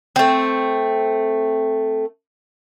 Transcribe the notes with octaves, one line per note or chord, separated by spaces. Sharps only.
A3 C4